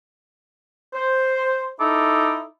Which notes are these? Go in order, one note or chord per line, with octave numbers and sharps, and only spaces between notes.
C5
D#4 E4 A4 D6